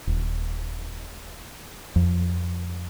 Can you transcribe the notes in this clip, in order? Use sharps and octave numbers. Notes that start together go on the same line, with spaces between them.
D#1
F2